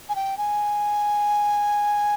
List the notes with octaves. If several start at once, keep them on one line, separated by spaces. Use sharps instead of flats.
G#5
G5
G#5